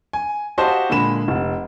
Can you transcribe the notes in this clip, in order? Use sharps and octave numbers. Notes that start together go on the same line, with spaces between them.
G#5
F#4 G4 C5 D#5 F5 A5
A#2 D3 G#3 B5 E7
F1